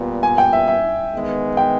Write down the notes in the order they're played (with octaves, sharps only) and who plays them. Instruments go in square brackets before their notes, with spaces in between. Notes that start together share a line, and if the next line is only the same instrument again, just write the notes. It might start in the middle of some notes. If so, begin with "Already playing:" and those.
Already playing: [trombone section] A#2 G3 B3
[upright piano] G#5
G5
E5
E5
[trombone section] D#3 G#3 B3
[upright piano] G5